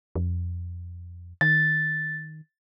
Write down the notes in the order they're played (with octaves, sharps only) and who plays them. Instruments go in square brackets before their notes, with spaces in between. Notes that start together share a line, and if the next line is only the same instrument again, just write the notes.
[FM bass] F2
[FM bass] D#3 [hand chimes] A6